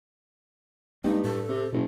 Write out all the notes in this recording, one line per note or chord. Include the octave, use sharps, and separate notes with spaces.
G2 G#3 A#3 C4 D#4
A2 A4
C3
F#1 B2